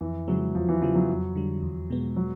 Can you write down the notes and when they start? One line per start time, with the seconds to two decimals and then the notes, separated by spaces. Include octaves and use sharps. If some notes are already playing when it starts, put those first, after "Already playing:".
0.01 F2 E3
0.28 C#3 F3 F#3 G#3
0.55 E2 F3
0.69 E3
0.81 C#3 E3 F3 G3
0.95 F#3
1.09 F2
1.35 D3 G3
1.63 E2
1.90 B2 G#3 B3
2.16 F#3